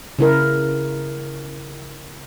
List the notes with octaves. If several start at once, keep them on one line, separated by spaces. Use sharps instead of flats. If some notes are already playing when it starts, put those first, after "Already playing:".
C#3 E4 A#4